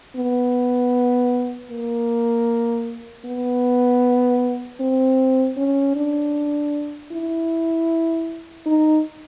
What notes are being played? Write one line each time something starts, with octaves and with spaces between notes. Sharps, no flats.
B3
A#3
B3
C4
C#4
D4
E4
D#4